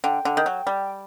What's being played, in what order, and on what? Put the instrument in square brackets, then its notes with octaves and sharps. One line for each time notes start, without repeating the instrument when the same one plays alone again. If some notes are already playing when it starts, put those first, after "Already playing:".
[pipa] D3 [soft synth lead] G5
[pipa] D3
D#3
F#3
G3